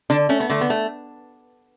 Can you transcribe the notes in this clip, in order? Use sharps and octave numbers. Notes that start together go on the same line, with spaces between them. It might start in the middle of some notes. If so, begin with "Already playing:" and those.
D3 D4
A3 C#4
B3
D3 A3
B3
A3